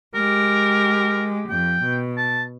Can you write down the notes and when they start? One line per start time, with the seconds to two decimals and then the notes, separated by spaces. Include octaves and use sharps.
0.15 G#3 G4 A#4
1.50 F2 G5
1.84 B2
2.18 A5